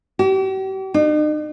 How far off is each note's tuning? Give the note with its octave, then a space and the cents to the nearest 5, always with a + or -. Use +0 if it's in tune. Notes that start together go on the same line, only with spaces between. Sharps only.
G4 -40
D#4 -45